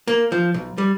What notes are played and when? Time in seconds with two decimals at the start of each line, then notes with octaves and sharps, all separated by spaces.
0.08 A#3
0.32 F3
0.54 B1
0.78 G3